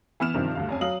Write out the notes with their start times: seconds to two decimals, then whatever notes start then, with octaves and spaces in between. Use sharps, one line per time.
0.20 E3 B3 F6 E7
0.34 G2 C3 D#3 F3
0.55 D2 G2 F5
0.69 F2 C#4 G#5
0.81 F#3 F5 D#6 F#7